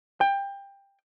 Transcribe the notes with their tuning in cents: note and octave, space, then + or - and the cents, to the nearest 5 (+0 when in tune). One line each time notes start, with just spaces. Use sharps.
G5 +20